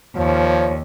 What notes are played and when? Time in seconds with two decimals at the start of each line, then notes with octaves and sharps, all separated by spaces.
0.16 D#2 A#2 F3 C#5